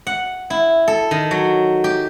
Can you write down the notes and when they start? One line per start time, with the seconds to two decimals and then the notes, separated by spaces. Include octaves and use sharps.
0.07 F#5
0.50 E4
0.88 A4
1.11 D#3
1.31 F#3
1.84 G4